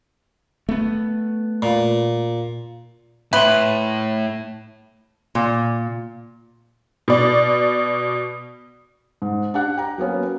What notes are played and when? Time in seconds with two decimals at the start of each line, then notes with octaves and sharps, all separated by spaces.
0.69 A3 B3
1.62 A#2
3.33 A2 B4 E5 C6
5.35 A#2
7.08 B2 D5
9.22 G#2
9.54 D4 G4 F#5 F#6
9.77 G5 A#5
9.98 F#3 A#3 B3 C#4